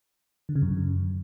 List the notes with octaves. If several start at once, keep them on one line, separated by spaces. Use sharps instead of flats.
D3
C#3
F#2